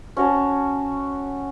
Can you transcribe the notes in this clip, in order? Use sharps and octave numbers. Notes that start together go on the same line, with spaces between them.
C#4 F#4 C#5 A5